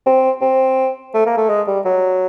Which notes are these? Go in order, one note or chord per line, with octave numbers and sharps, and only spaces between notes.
C4
C4
A3
A#3
A3
G#3
G3
F#3